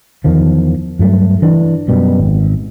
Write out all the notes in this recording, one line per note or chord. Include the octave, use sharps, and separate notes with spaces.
E2 D#3 F3
G2 F#3 A3
E3 D4
F#2 B2 G3
G#1